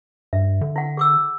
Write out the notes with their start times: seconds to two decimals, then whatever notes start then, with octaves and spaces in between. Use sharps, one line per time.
0.33 G2 E5
0.61 D3
0.76 E4 F#5
0.97 G#4 D6 E6